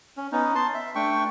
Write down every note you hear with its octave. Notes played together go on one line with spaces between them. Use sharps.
C#4
B3 C#4 D#4
A5 C6
E5
A3 D4 G5 C#6